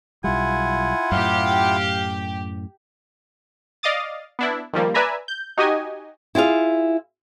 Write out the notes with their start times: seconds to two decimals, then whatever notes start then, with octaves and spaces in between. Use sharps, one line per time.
0.24 B1 G3 E4 F4 F#5 G#5
1.12 F#2 A2 G4 F5
3.83 D5 D#5 F5 D6 D#6 A6
4.39 B3 D4 E4
4.73 D#3 F3 G3 A#3
4.94 B4 D5 E5 G#5 A#5 B5
5.28 G6
5.58 D#4 F#4 G4 D#5 G#5
6.35 E4 F4 G#4 F5